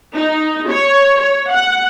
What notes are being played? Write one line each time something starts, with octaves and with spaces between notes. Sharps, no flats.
D#4
C#5
C#5
F#5